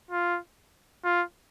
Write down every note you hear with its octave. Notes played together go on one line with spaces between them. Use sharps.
F4
F4